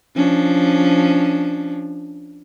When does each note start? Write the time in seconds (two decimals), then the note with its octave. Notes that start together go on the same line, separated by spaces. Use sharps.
0.16 F3 C#4 D4